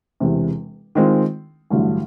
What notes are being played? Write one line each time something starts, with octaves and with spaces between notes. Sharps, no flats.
E1 E2 C3
D#3 G#3 C4 F4
A1 G2 D3 F#3